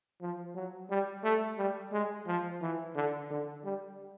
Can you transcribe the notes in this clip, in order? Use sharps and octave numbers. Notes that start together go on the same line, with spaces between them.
F3
F#3
G3
A3
G3
G#3
F3
E3
D3
D3
G3